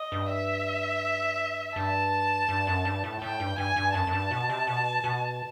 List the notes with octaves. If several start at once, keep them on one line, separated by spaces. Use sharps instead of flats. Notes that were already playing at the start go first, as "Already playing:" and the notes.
Already playing: D#5
G2
E5
G2 A5
G2
F#2
G2
A2
A2 G5
G2
G2 G#5
G2
F#2 A5
F#2
G2
B2
C3
B2
B2